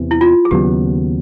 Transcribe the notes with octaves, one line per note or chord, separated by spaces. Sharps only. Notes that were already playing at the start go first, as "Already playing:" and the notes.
Already playing: E2 C3 E3
E4
F4
G#4
D#2 C#3 F#3 B3 G4